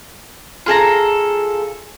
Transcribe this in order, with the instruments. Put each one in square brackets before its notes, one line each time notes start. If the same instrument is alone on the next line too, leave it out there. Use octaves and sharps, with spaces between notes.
[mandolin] F4 G#4 A4 A#5